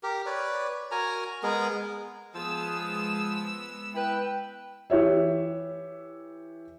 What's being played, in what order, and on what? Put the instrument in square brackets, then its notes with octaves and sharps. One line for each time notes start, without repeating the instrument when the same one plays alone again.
[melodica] G4 A#4
B4 C#5 D5
F#4 A#4 G#5 A#5
G#3 B3 G#4 A#4
[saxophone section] F3 G#4 [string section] G#3 B3 E6
[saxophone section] E4 B4 [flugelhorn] G5
[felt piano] E3 G4 C#5 E5